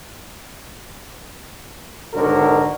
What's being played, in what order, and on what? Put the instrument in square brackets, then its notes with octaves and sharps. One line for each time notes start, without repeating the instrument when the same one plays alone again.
[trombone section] B1 G#2 D3 D#3 F#4 A#4